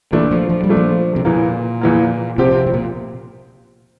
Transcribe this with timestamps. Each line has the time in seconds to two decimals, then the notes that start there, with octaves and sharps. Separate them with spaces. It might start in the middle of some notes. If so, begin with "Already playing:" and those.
0.13 A#2 E3 A3 D4
0.31 F3
0.49 F3
0.64 G3
0.69 A#2 A3 D4
0.77 F3
1.16 C3
1.25 E2 A#2 E3 A#3
1.81 E2 E3 A#3
2.38 C3 F3 C4 G4
2.52 C3
2.67 C3
2.74 A#2